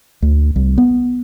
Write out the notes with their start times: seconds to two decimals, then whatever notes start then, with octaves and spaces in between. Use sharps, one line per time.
0.22 D2
0.56 C2
0.78 B3